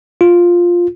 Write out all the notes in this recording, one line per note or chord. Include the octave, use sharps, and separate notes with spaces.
F4